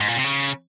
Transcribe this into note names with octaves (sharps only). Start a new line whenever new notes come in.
G#2
A#2
C3
C#3